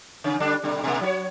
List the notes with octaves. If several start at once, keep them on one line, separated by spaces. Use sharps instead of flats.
C#3 C#4
D3 G3 D4
B2 D3 G3
B2 A#3
F#3 F4 C#5